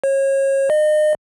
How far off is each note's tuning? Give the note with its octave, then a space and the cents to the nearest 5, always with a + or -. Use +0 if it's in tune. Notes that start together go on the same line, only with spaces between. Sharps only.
C#5 -30
D#5 -35